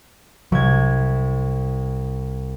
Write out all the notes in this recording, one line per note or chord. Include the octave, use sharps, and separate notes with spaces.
C2 F#3 G#6